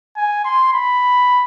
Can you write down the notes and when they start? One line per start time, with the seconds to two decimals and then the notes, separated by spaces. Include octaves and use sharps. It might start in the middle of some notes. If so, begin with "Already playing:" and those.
0.16 G#5
0.45 C6
0.73 B5